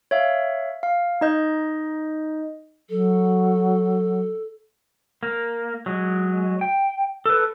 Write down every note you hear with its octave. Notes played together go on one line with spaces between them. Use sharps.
C#5 E5 F5
F5
D#4 D#5 G6
F#3 A4
A#3
F#3 G#3
G5
A4 B4